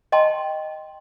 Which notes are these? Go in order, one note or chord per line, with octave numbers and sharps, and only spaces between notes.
D#5 G5 A5 C6